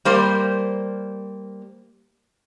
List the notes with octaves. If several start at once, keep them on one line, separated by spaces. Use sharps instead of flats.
G3 A#3 C5